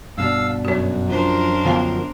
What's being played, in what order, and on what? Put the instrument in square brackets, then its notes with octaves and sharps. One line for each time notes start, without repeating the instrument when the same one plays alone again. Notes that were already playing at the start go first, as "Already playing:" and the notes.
[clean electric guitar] G2 B2 D4 [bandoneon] F5 E6
[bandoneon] F#2 [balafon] F#4 C#5
[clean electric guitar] F3 [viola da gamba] D4 A#4 C5
[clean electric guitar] D3 F3 [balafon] B3 F5 G5